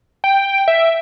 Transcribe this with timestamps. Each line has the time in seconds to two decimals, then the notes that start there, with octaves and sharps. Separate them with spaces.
0.24 G5
0.68 E5